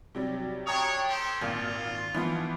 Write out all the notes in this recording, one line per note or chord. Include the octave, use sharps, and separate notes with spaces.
C3 F#3 G3
D4 C#5 G5 A#5 D#6
G4 A4 C5
G#1 A#2 F4
E3 F3 B3